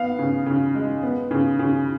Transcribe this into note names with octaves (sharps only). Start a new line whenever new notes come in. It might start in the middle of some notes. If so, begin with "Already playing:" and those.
Already playing: B3 F5
C#3
C#3
G#3
B3
C#3
C#3